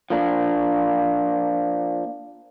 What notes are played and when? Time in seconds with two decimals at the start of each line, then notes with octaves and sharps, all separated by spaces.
0.10 F3 A#3 D4